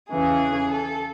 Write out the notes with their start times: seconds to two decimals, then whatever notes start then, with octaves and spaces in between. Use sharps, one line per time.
0.10 E2 C#3 E3 G#4
0.71 A4